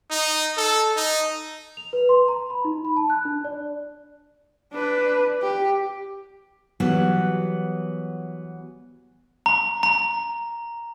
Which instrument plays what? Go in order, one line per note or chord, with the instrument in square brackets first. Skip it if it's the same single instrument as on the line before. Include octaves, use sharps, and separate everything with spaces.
[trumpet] D#4
A4
D#4
[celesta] F7
B4
C6
A#5
B5
D#4
B5
A5
F#6
D4
D5
[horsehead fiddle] D4 B4
G4
[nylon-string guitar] E3 F#3 G3 B3 F#4
[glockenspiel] A#5
A#5